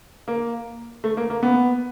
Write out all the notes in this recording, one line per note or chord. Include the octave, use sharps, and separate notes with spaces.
A#3
A3
A#3
A#3
B3